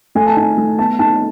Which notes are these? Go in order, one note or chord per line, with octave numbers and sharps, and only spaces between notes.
A3 G#5
A5
D#4 G#5
A3
B3 A5
D#4 A5